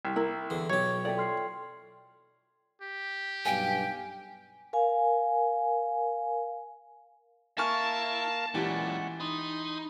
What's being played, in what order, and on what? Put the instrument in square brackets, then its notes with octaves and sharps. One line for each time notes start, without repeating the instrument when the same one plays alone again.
[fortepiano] C2
[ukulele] E4 A#4
[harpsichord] E2 D3
[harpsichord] B1 G4 [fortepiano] C#5
[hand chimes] F4 A4 G5 [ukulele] D5 E5
[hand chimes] C6 F6 C7
[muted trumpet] G4
[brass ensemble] B1 G2 [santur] F5 G#5 [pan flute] G5
[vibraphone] A#4 F5 G#5
[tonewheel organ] A#3 A#4 F5 [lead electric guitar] E4 [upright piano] G#5 C#6 F6 [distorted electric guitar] A5
[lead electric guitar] F#2 A#2 [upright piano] E3 G4 [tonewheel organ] G#3 C#4 F#5
[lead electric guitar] D#4 [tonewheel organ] B5 C6 D#6